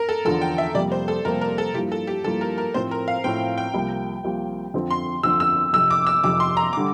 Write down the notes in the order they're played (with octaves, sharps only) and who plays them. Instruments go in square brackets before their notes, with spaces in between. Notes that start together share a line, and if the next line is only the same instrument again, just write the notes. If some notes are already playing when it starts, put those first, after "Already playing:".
Already playing: [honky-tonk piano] A#4
A4
[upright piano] E2 D3 F3 [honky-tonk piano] A4
[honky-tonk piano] G5
E5
[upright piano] F2 C3 G3 A#3 [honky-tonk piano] D5
[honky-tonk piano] C5
A4
[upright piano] F2 C3 G3 A#3 [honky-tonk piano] A#4
[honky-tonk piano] A#4
A4
[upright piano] G2 F3 A#3 E4 [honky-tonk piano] G4
[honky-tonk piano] A4
G4
[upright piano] G2 F3 A#3 E4 [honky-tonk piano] A4
[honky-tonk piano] A#4
A#4
[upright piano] A2 F3 C4 [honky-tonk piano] C5
[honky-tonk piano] A#4
F5
[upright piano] A2 F3 C4 [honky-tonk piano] G5
[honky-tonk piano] G5
[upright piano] C2 C3 F3 A#3
C2 C3 F3 A#3
F2 D3 F3 C4
[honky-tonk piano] C6
[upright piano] F2 D3 F3 C4 [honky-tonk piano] E6
[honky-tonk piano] E6
[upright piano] F1 F2 C3 [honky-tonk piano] E6
[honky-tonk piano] D6
E6
[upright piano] F1 F2 C3 [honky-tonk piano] D6
[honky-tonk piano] C6
A#5
[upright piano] D3 G3 [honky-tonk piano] D6